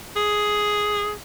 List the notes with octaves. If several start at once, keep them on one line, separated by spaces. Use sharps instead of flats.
G#4